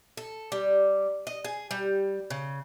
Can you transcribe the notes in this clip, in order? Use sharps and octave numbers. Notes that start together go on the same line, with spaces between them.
A4
G3
D#5
G#4
G3
C#3